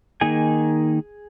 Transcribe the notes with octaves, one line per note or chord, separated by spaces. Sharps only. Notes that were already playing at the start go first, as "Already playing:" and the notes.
D#3 A#3 D#4 G#4 G#5